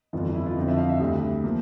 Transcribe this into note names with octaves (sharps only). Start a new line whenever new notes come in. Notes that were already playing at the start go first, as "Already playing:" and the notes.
G1 F2 E3 F4
F4
E4
F4
F2 D3 F3 C4
E5
F5
E5
D2 D3 G3
F3 A#3